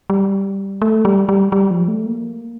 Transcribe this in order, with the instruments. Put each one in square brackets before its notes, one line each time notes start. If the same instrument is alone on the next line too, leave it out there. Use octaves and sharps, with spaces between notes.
[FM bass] G3
A3
G3
G3
G3
F3
A3
A#3